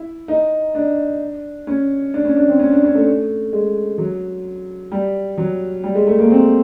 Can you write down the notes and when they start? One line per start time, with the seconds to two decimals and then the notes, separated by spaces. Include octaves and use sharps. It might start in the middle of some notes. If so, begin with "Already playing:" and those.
Already playing: E4
0.28 D#4
0.75 D4
1.67 C#4
2.14 D4
2.25 C#4
2.36 D4
2.48 C4
2.59 C#4
2.71 D4
2.83 C#4
2.95 A3
3.53 G#3
3.98 F#3
4.92 G3
5.38 F#3
5.84 G3
5.95 G#3
6.07 A3
6.19 A#3
6.30 C4